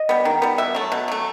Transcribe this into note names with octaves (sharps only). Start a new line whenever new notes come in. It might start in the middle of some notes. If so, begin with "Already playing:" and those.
Already playing: D#5
G3 B3
D#3
G3 B3
B2 E5
F#3 A3
B2
F#3 A3